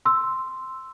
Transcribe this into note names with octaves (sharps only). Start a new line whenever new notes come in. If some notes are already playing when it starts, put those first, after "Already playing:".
C6 E6